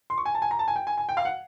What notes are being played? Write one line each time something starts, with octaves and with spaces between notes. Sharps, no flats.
C6
C#6
G#5
A5
G#5
A#5
A5
G#5
G5
G#5
G#5
G5
F5
F#5